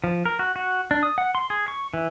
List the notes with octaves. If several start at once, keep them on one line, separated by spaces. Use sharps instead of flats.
F3
A#4
F#4
F#4
D4
D#6
F#5
C6
G#4
C#6
E3